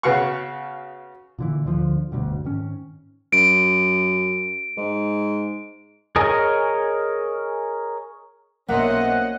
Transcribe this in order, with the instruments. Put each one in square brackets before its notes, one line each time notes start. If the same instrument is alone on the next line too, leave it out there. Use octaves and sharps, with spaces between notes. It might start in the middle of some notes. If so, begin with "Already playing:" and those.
[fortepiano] C#3 B3 F#4 F5 F#5 C#6
[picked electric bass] A#2 D3 E3
D2 D3 F3
E1 D2 G2 B2
G#2 D#3 C#4
[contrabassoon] F#2 [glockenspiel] D7
[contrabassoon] G#2
[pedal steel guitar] G#4 A#4 C#5 D#5 G#5
[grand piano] B1 E5 C6 [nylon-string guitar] A#3 [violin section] C#4 C5 D#5 [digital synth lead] F#5